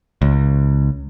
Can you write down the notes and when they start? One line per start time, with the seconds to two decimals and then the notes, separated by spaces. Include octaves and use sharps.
0.22 C#2